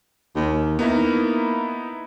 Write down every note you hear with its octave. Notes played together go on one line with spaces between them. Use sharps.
D#2
A#3 B3 D#4 E4